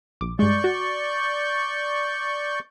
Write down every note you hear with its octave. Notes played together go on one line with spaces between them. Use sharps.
A#1 D6
G2 G#3 D5 C#6 G6
F#4